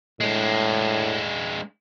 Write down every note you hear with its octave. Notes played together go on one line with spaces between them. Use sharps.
A2 G#3 D4